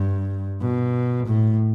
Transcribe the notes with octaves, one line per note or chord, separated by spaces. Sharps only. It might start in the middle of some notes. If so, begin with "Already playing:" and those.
Already playing: G2
B2
A2